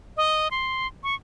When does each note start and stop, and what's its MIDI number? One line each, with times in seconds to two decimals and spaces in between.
0.17 0.48 75
0.51 0.87 84
1.03 1.15 85